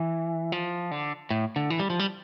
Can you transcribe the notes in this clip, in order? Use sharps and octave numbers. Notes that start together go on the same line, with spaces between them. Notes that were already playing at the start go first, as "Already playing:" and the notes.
Already playing: E3
F3
D3
A2
D3
E3
G3
F3
G3